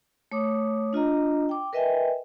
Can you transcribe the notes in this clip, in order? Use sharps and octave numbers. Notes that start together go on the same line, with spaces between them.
A3 C#5 D6 D#6
D4 F4 D#5 A#5
G5 D6
A#4 B4 D#5 E5 G5 G#5